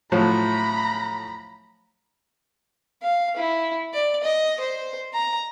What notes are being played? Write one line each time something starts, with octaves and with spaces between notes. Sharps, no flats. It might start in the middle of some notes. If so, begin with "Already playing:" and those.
A2 F3 F#3 A#5 B5
F5
E4
D5
D#5
C5
A#5